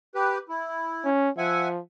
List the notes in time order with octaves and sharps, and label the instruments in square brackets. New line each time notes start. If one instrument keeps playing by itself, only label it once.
[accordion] G4 B4
E4
[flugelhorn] C#4
[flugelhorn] F3 [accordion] E5 F#5 G#5